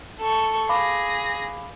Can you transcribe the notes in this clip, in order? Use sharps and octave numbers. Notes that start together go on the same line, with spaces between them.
A4 C#6
G#4 F5 B5 D6 A#6